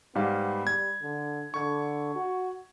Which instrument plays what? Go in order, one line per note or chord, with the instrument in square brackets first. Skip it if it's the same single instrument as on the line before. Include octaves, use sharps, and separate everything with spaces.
[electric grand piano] G#2 G3 F5 [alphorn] B3
[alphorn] G3 [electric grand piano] G#6
[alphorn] D3
[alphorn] D3 [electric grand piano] C#6 G#6
[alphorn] F#4